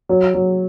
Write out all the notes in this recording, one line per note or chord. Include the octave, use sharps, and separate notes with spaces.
F#3
F#3